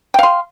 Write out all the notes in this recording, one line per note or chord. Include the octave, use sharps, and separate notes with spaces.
F5 G5 C6